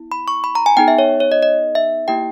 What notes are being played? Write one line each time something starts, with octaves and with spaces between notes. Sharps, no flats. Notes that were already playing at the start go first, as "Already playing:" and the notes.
Already playing: B3 E4
B5
C#6
B5
A#5
G#5
B3 D#4 G#4 G5
E5
C#5
C#5
D#5
D#5
E5
A#3 E4 G4 G5